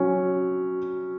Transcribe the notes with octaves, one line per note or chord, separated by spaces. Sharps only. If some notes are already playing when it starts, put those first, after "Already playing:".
Already playing: F#3 C#4